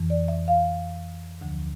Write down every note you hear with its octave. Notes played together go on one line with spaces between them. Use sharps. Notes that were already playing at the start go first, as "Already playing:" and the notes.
Already playing: F2 E3
D5
E5
F5
D2 D3 F3